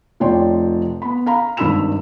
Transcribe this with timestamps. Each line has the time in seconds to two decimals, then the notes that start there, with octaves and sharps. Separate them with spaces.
0.20 F1 F3 C#5 D5 G5 C6
1.02 B3 B5
1.26 F5 A#5 B5
1.57 G#1 G2 D#3 B5 E6 E7